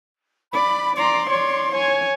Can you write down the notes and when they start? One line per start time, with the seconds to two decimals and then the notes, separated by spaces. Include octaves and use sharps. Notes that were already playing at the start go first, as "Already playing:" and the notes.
0.54 D5 B5
0.97 D5 A#5 C6
1.30 C#5 D5
1.72 C#5 G#5